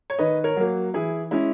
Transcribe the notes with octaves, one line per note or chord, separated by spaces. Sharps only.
C#5
D#3 B4 D#5
A#4 C#5
F#3 A#3
E3 E4 G#4
G#3 C#4 E4